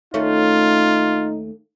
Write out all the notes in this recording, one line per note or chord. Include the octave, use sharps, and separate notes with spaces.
D#2 A3 C#4 D#4 F4